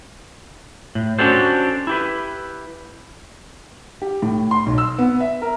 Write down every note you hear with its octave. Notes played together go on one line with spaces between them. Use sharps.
A2
C#4 D4 F#4 G4 A4 C5
E4 G4 B4
G4
A2
C6
B1
E6
B3
E5
A#4